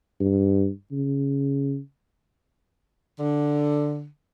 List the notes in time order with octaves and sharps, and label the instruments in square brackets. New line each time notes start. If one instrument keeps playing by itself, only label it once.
[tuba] G2
C#3
[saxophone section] D3